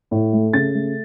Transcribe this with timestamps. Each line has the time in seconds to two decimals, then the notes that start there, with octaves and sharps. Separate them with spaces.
0.11 A2
0.33 A3
0.53 C#3 A6
0.75 A3